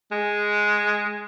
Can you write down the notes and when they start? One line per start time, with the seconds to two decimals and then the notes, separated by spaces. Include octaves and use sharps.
0.12 G#3